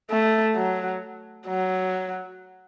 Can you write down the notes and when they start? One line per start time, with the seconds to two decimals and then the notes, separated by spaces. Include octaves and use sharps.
0.10 A3
0.56 F#3
1.47 F#3